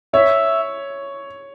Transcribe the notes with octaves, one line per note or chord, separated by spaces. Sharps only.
C#5 E5